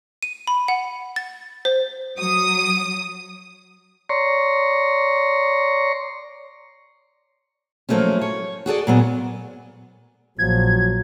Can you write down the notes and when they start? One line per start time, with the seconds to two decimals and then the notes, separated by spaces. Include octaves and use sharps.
0.23 D#7
0.47 B5
0.68 F#5
1.16 A6
1.65 C5
2.18 F#3 D#6
4.09 C#5 D5 A#5 C6 C#6
7.89 F3 F#3 A3 A#3 C#4
8.21 C#5
8.66 F#4 G#4 A4 D5
8.87 A#2 F#3 B3
10.39 A#1 F3 F#3 G#6